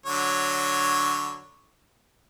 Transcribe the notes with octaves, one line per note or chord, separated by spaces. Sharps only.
D3 F#3 C#5